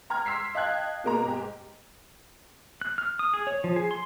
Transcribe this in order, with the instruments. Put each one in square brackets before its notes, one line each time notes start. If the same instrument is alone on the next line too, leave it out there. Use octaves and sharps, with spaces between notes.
[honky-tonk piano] G5 A#5 F6 G#6
C6 E6 B6 C7
D#5 F5 G5 A5 F#6 G#6
B2 A#3 A#5
G#2 G4
[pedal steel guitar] F#6
F6
D#6
G#4
C#5
F3
G#4
C6